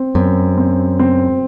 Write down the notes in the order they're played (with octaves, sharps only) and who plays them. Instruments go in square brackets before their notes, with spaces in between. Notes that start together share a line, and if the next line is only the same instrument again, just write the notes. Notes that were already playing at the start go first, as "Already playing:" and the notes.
Already playing: [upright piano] C4
[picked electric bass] F#2 [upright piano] C4
[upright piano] C4
C4